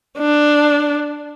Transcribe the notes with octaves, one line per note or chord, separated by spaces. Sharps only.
D4